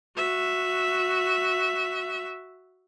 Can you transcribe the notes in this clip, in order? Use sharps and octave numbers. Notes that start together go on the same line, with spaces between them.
F#4 E5